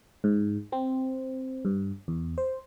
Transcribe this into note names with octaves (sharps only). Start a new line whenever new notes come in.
G#2
C4
G2
E2
C5